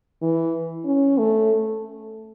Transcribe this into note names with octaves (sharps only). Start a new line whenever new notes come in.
E3
C#4
A3